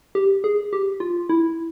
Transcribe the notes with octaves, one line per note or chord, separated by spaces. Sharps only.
G4
G#4
G4
F4
E4